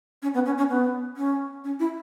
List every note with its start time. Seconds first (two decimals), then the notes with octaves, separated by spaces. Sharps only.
0.22 C#4
0.34 B3
0.46 C#4
0.58 C#4
0.69 B3
1.17 C#4
1.64 C#4
1.79 E4